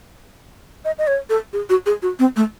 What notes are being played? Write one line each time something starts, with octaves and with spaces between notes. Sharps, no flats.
D#5
D#5
C#5
A4
G#4
F#4
G#4
F#4
C4
A3